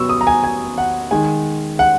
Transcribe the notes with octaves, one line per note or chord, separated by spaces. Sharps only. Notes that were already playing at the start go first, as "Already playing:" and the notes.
Already playing: B2 F#3 B3 C#6 E6
D#6
A#5
G#5
G#5
F#5
D#3 G#3 D#4 G#5
F#5